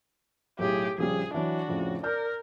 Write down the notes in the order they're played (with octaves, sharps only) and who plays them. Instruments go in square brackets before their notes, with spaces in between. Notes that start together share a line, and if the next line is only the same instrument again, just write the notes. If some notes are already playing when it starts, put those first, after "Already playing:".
[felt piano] B1 A2 [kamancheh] G4 G#4
[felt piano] A#1 C#3 G3 [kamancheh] G#4
[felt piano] E3 F#3 [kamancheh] D4 F#4
[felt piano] F2 A2 C#3
[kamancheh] A#4 [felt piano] D5 F6 G6